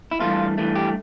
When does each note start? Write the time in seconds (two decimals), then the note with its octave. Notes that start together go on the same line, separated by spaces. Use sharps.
0.11 E4
0.20 G2 E3 A3 F4
0.58 G2 E3 A3
0.76 G4